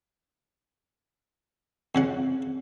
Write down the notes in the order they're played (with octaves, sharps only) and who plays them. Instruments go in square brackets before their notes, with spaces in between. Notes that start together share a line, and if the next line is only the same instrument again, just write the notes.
[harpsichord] F2 C#3 F#5